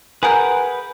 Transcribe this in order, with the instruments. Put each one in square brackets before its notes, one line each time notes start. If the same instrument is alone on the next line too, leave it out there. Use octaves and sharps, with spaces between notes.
[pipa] G#4 A#4 [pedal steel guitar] B4 F#5 G6